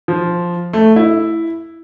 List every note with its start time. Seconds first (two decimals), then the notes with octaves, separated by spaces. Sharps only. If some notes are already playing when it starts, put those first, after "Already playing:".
0.08 F3
0.73 A3
0.96 E4